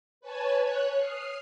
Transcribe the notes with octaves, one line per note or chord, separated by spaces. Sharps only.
B4 C#5 G#5 A5
C#5 F#6
D#6 F6 C7